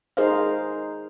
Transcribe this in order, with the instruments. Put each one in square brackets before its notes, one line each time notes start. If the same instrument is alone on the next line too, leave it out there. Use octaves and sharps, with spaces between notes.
[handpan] D#4 G#4 A#4 C5 D#5 F5